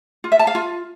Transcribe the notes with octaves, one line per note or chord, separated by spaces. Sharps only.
F4
E5
A5
F5
F4